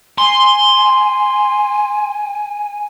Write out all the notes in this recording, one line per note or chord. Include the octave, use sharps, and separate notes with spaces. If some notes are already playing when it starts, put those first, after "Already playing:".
G#5 C6